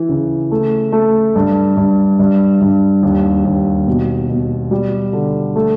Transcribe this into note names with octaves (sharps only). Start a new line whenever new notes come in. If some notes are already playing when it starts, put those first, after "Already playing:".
Already playing: E3
C#3
A3
A3
G2
G2
G2
G2
D#2
D#2
B2
B2
G3
D3
A3